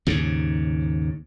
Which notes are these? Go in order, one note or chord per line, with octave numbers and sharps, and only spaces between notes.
D#2 G#2 C#3